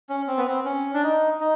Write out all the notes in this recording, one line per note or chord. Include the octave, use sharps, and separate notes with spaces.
C#4
C4
B3
C4
C#4
D4
D#4
D#4